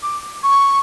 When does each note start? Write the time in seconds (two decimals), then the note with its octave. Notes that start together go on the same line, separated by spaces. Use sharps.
0.03 D6
0.43 C#6